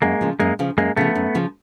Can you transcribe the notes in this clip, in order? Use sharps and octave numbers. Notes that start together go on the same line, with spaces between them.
F#2 G#3 A#3
C#3 F3
F#2 G#3 A#3
C#3 F3
F#2 G#3 A#3
C#3 F3 A3 B3
F#2
C#3 F3